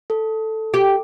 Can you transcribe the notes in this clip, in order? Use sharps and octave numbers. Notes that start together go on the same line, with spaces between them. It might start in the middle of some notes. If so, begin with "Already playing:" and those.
A4
G4